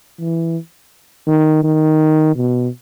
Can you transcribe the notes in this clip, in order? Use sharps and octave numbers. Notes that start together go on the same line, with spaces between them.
E3
D#3
D#3
B2